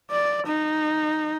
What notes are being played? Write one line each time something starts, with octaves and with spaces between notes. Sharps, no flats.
D5
D#4